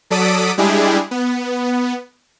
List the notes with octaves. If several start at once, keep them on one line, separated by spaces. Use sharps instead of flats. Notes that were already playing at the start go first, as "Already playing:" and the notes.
F#3 A4 D5 D#6 B6 D7
G3 G#3 D4 E4 G4 G#4
B3